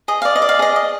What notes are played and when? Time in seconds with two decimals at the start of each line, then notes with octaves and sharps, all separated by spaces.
0.08 G#4 D#5
0.22 D5 F5
0.36 D#5
0.42 D5
0.49 F5
0.59 G#4 D#5
0.76 D#5